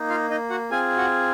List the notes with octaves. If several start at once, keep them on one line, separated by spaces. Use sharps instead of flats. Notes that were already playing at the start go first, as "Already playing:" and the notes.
Already playing: A#3 D#4
F4 F5
D#4 D#5
F#4 F#5
C4 F4 G#4 G#5
F#4 F#5